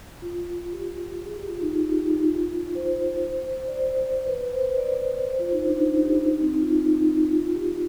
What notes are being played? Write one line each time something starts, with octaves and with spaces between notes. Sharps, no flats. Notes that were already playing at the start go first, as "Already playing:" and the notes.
F4
G4
G#4
G4
F4
D#4
F4
G4
D#4
F4
C5
D5
C5
B4
C5
B4
C5
D5
C5
F4
D#4
D4
D#4
G4
D#4
C4
F4
D#4
D#4
F4
F4
G4